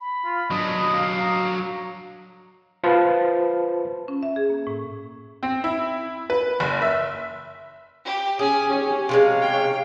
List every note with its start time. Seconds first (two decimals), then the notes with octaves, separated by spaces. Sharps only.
0.01 B5
0.25 F4
0.51 F#3 D4 D#5
0.93 F5
1.21 A#5
2.84 F4 B4 C5 A5
4.08 C#4
4.23 E5
4.36 G#4
4.50 A#3
4.67 A2
5.43 C4
5.64 E4
6.30 B4
6.60 F#1
6.82 E5
8.05 G4
8.39 C#4 G#4 G#5
8.68 C#4 G4 C#5
9.09 C3 G3 G#3 C#5 F5
9.41 G5